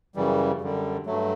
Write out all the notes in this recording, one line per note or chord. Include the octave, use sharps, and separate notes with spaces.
F#2 C#3 E3 G3
F#2 D3 G3
G2 F#3 A3